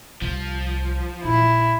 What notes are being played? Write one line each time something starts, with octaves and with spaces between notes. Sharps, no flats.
C2 F3
A#1 E4